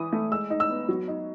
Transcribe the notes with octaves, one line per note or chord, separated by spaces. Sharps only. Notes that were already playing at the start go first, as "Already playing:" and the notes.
Already playing: E3 E4 D#6
A3
G#3 E6
D#4
E6
B3
F#3
D#4